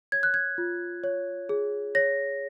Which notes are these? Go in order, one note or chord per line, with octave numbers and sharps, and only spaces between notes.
C#5 G#6
F#6
G#6
F4
C#5
G#4
C#5 A#6